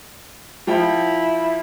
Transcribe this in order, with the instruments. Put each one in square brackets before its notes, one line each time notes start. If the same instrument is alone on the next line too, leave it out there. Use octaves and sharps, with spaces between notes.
[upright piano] F3 F5 G5 [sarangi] E4